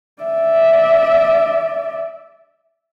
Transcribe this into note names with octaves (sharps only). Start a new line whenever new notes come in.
D5 E5